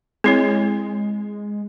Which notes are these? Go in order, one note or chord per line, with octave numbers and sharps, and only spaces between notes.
G#3 C4 E4 C#5